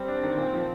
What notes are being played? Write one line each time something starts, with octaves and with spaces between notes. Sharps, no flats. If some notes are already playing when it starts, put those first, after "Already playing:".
Already playing: G3 C4
D4
D#3
A#2
F3